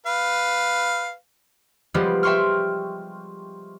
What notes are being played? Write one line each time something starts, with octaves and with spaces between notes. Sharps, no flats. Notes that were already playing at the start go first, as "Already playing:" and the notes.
B4 F5
F3 G3 G#3 B3 F4 G4
E5 G5 C6 C#6 F6